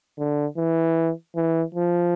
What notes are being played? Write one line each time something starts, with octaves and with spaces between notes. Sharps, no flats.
D3
E3
E3
F3